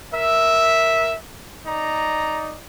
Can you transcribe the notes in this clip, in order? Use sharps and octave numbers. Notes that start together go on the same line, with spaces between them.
A#4 E5
D#4 D5 A#5